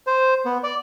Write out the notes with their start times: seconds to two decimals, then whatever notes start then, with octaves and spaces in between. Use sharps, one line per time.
0.07 C5
0.46 B3
0.64 D5